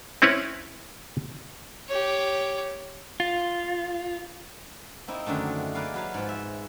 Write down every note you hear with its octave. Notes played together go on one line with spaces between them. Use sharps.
C4 C#4 E4 B4 C#5
G4 C#5
F4
A#3 C4 D#4 E4
F#2 D3 D#3 A3
G#3 A#3 B4 D5 F5
F#3 B4 F5
G#2 F3
E5